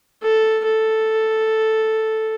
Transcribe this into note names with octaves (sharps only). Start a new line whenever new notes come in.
A4
A4